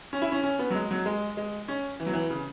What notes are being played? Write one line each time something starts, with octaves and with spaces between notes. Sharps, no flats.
C#4
E4
C#4
C#4
B3
F#3
G#3
F#3
G#3
G#3
C#4
E3
F#3
E3
C#3